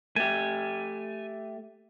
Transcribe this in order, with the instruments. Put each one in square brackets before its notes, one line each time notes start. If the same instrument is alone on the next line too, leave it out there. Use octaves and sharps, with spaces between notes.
[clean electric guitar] A3 G4 [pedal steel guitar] G#5